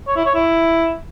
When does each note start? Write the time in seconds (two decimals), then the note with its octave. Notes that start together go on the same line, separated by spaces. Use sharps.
0.07 C#5
0.16 E4
0.25 C#5
0.34 E4